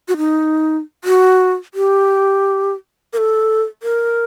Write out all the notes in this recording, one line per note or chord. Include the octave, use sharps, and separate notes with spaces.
F#4
D#4
F#4
G4
A#4
A4
A#4